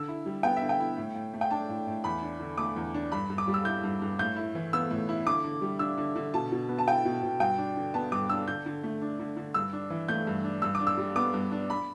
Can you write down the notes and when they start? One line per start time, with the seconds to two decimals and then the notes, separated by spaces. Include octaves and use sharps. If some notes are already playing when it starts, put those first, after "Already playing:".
Already playing: D3 E6
0.08 E4
0.26 G3
0.43 B3 G5
0.57 E5
0.62 D3
0.69 G5
0.80 E4
0.97 A2
1.15 A2
1.33 A3
1.41 G5
1.50 D4 A5
1.69 A2
1.87 A2
2.04 E2 B5
2.22 D4
2.40 D3
2.58 A3 D6
2.76 E2
2.94 D4
3.12 G2 B5
3.30 G2
3.38 D6
3.47 G3
3.54 E6
3.65 E4 G6
3.83 G2
4.02 G2
4.19 A2 G6
4.36 E4
4.55 E3
4.73 B3 E6
4.90 A2
5.09 E4
5.26 D3 D6
5.44 D3
5.61 G3
5.79 D4 E6
5.97 D3
6.16 D3
6.34 B2 A5
6.52 B2
6.69 B3
6.79 A5
6.87 E4 G5
7.05 B2
7.23 B2
7.40 G2 G5
7.58 D4
7.77 D3
7.94 B3 A5
8.12 G2 D6
8.29 D4 E6
8.48 D3 G6
8.66 D3
8.83 A3
9.01 D4
9.19 D3
9.37 D3
9.54 G2 E6
9.73 D4
9.90 E3
10.08 A3 G6
10.27 G2
10.44 D4
10.62 G2 E6
10.75 D6
10.80 D4
10.87 E6
10.98 G3
11.16 B3 D6
11.34 G2
11.52 D4
11.70 B5